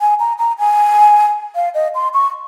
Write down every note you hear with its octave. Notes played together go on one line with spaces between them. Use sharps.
G#5
A#5
A#5
G#5
F5
D#5
C6
C#6